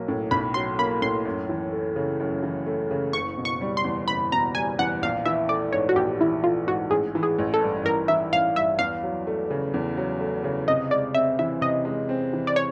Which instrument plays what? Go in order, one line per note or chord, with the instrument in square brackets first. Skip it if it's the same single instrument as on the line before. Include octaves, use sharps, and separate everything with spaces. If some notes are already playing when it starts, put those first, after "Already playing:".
Already playing: [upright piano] B1 F#3 A#3
A2
[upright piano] B1 [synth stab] B5
[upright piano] F#3 [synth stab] C6
[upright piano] A#3 [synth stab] B5
[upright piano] A2 [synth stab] C6
[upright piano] F#2
E3
A3
C#3
F#2
E3
A3
C#3
[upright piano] F#1 [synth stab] C#6
[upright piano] B2
[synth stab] C#6
[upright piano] G3
[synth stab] C6
[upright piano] E2
[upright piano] F#1 [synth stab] B5
[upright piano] B2 [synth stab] A#5
[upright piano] G3 [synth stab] G#5
[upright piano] E2 [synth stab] F#5
[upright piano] A#1 [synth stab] F5
[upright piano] E3 [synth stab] E5
[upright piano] A3 [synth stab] D5
[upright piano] G#2 [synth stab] C#5
[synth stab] F#4
[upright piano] A#1 [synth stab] G4
[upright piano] E3 [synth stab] E4
[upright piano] A3 [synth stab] F4
[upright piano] G#2 [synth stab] F#4
[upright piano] A1 [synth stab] G#4
[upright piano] E3
[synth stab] G#4
[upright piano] A1
[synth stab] A4
[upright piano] G2
[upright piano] A1 [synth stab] A#4
[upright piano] E3 [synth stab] E5
[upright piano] A1 [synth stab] F5
[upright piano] G2 [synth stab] E5
[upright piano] E2 [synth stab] F5
[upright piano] F#3
A3
C#3
E2
F#3
A3
C#3
[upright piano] C3 [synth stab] D#5
[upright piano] G#3 [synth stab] D5
[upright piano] C4 [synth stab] E5
[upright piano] E3 [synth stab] E5
[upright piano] C3 [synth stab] D#5
[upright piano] G#3
C4
E3
[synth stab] D5
C#5